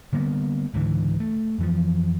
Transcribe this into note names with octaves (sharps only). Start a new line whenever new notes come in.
D3 G3 A#3 B3
C#2 G#2 D3 E3
A3
F2 E3 F3